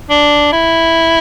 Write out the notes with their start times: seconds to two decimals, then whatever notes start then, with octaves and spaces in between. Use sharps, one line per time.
0.10 D4
0.53 E4